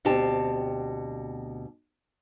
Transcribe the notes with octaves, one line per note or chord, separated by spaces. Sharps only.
D2 B2 C4 G4 A5